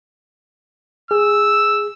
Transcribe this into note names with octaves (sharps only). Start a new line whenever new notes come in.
G#4 E6